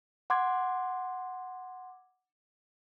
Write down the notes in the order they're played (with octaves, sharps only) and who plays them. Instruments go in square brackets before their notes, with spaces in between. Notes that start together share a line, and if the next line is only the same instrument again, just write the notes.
[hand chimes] F#5 C6 D6 G#6